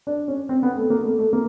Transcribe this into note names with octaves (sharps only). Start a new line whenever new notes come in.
D4
C#4
C4
B3
A3
A#3
A3
A3
A#3